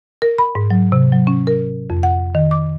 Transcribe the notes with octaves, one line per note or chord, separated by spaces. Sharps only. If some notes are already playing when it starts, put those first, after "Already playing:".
A#4
B5
G#2
F#3
C3
F#3
C#4
A#4
F2
F#5
D#3
D6